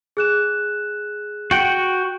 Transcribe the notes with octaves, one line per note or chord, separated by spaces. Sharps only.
G#4 F#6 E7
F#4 G5